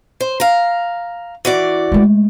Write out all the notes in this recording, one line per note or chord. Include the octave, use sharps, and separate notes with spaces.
C5
F5 A#5
E3 F#4 D5
G#3 A3